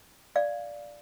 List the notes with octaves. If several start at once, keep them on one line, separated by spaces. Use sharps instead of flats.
D5 F5